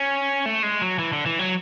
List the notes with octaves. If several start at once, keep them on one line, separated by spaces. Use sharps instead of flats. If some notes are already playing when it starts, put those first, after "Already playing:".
Already playing: C#4
A3
G#3
F#3
E3
D3
E3
F#3